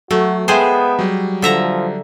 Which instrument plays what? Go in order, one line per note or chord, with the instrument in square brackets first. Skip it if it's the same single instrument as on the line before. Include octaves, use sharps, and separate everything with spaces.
[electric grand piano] F#3 [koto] A3 [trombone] F#4
[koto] G#3 G#4 C5 [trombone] B3 [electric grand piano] E5 G5 A5
[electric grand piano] F#3 G3
[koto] D3 E5 A#5 [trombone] F3